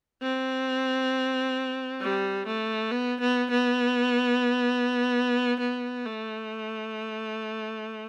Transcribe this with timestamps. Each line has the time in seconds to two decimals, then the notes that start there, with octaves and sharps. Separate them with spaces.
0.22 C4
2.01 G3
2.47 A3
2.91 B3
3.21 B3
3.51 B3
5.60 B3
6.05 A3